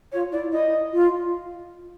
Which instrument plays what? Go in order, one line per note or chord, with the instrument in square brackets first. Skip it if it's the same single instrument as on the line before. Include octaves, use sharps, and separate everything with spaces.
[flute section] F4 [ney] C#5
[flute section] E4 [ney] D5
[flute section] E4 [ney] D#5
[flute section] F4